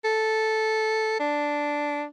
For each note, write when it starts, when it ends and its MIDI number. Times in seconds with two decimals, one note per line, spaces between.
0.05 1.18 69
1.20 2.05 62